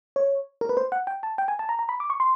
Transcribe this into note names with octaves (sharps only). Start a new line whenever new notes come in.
C#5
A#4
B4
C5
F#5
G5
A5
G5
G#5
A5
A#5
A#5
B5
D6
C#6
C6